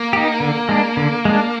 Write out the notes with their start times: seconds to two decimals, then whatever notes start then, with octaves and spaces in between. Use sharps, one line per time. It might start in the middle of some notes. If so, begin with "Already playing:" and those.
Already playing: A#3
0.13 D#4 G4
0.40 D3
0.69 G#3 D4
0.97 D3
1.25 G#3 D4